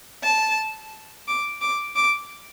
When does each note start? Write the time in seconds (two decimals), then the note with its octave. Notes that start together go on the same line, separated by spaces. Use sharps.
0.24 A5
1.28 D6
1.61 D6
1.96 D6